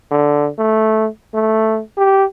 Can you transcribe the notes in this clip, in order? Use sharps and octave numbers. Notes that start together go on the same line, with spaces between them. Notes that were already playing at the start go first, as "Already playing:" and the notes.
D3
A3
A3
G4